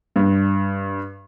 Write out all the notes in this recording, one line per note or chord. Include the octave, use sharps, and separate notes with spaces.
G2